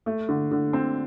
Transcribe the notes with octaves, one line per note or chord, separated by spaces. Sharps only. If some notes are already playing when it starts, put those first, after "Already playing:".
A3
D3
D3
C4